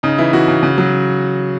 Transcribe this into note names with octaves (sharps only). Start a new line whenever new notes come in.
C#3 D#4
E3 E4
E3 F#4
C#3
C#3
F#3